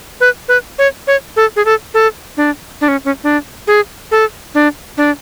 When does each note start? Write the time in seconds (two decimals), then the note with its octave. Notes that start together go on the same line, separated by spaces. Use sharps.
0.20 B4
0.48 B4
0.79 C#5
1.07 C#5
1.36 A4
1.56 G#4
1.65 A4
1.94 A4
2.37 D4
2.81 D4
2.88 C#4
3.05 C#4
3.24 D4
3.67 G#4
4.11 A4
4.55 D4
4.97 D4